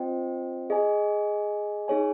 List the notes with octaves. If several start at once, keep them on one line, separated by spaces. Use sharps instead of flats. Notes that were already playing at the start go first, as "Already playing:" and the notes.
Already playing: C4 F4 C5 D#5 G5
G#4 D#5 G#5
D#4 G#4 C#5 G#5